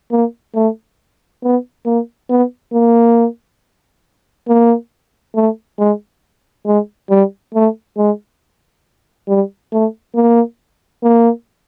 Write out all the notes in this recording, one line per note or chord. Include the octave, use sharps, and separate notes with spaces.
A#3
A3
B3
A#3
B3
A#3
A#3
A3
G#3
G#3
G3
A3
G#3
G3
A3
A#3
A#3